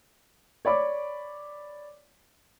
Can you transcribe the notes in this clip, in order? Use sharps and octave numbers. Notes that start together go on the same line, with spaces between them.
C#5 D5 B5 D6